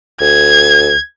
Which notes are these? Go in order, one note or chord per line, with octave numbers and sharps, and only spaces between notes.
D2 G#6